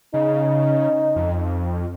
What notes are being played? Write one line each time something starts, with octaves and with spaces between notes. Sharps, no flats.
C#3 D#4
F2